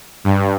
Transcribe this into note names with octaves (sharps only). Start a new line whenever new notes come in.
G2